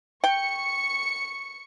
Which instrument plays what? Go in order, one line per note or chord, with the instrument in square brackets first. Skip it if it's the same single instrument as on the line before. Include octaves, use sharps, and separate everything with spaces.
[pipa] G5 [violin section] C#6 C#7